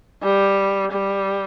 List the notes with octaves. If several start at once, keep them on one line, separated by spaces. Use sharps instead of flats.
G3
G3